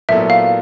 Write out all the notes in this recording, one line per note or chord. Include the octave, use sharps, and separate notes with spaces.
A#2 F#3 B3 E4 A4 E5
F5